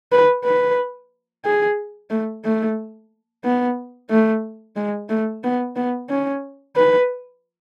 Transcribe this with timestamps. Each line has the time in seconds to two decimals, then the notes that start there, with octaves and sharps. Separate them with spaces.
0.12 B4
0.44 B4
1.45 G#4
2.10 A3
2.44 A3
3.44 B3
4.10 A3
4.76 G#3
5.09 A3
5.44 B3
5.76 B3
6.09 C#4
6.76 B4